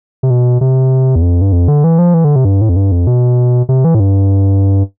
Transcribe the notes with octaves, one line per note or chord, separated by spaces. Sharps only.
C3
B2
C3
E2
F2
G2
F2
D3
E3
F3
E3
D3
C3
G2
A2
F2
G2
F2
B2
C3
E3
A2
G2